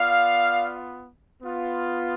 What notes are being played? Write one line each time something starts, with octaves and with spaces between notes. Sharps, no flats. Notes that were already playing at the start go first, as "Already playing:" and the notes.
Already playing: B3 F4 D5 F5
B3 F4